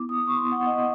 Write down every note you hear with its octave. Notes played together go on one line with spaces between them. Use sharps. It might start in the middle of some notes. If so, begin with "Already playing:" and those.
Already playing: B3 E4 D6
D#6
D6
C#6
B3 E4 C6
F#5
D#5